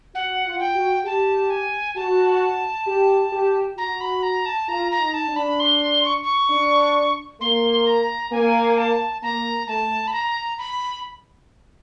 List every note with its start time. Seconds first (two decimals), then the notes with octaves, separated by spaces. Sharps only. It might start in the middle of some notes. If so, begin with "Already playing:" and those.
0.14 F#4 F#5
0.46 F4
0.60 G5
0.75 F#4
1.05 G4 A5
1.50 G#5
1.96 F#4 A5
2.87 G4
3.33 G4
3.77 F#4 A#5
4.01 B5
4.23 A#5
4.46 A5
4.68 F4 A#5
4.92 A#5
4.99 D#4
5.14 A5
5.28 D4
5.36 B5
5.60 C6
6.05 C#6
6.23 C#6
6.50 D4
7.41 A#3 C6
7.86 A#5
8.32 A#3 G#5
8.77 A5
9.22 A#3 A#5
9.67 A3 A5
10.07 B5
10.13 A#5
10.59 B5